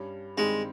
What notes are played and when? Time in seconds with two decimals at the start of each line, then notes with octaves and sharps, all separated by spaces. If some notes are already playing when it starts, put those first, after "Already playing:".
Already playing: G2 G3 C#4
0.37 G2 D#3 G3 G#3 C4